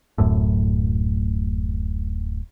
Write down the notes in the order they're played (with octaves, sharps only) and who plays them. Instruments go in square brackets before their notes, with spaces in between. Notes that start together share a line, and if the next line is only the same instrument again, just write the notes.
[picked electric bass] D1 F#2 A2